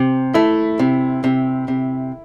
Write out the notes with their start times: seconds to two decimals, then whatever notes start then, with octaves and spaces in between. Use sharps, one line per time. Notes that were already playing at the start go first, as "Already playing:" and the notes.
Already playing: C3
0.34 A3 E4
0.79 C3
1.24 C3
1.68 C3